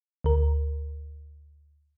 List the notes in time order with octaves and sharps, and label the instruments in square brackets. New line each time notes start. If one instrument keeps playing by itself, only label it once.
[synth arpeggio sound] D2 A#4